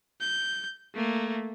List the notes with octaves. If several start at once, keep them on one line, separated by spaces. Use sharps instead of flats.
G6
A3 A#3